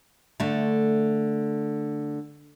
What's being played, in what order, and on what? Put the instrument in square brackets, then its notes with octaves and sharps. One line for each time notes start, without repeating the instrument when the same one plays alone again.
[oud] D3 A3